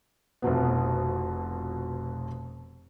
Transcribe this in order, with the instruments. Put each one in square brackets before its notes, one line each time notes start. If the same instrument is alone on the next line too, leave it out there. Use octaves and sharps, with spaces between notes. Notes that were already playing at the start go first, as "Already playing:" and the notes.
[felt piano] F1 F2 B2 B3